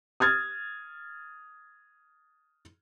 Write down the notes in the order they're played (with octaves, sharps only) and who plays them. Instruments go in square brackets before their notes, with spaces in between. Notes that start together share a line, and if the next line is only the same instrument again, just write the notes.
[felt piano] D#6 F6 G#6 A6